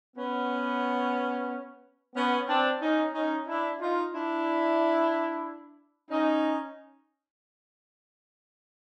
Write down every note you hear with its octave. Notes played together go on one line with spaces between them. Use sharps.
B3 C#4
B3 C#4
C4 D4
C#4 D#4
C#4 D#4
D4 E4
D#4 F4
D4 E4
C#4 D#4